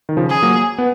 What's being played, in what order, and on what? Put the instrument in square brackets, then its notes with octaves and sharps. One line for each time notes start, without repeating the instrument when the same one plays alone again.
[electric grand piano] D#3
C#3 F3
[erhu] G#4
[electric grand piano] F#3 A#3
B3